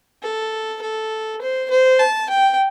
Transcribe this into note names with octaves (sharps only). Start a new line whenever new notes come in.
A4
A4
C5
C5
A5
G5